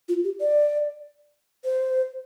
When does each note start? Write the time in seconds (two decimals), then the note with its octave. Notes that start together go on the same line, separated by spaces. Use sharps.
0.09 F4
0.24 G4
0.40 D5
1.64 C5